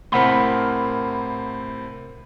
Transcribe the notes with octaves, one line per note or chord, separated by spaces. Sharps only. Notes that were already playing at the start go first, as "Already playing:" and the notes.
A2 C3 C4 A#4 F#5 B5